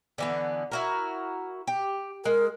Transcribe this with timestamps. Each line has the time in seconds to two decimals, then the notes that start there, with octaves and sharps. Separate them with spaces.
0.18 D3 E3 B3
0.71 E4 F#4 A#4
1.67 G4
2.25 G#3 A#4